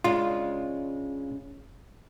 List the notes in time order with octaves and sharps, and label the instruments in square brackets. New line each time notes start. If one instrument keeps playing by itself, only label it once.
[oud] C#3 G#3 D4 [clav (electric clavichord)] F4